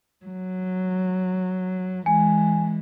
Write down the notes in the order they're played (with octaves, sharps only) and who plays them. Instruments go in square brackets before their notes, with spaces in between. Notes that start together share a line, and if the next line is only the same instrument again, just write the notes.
[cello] F#3
[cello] E3 G#3 [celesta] G#5